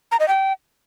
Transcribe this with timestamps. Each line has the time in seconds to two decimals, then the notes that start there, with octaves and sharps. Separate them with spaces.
0.12 A#5
0.20 D#5
0.28 G5